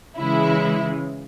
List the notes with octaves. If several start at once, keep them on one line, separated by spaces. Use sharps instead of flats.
C#3 E3 G#3 E4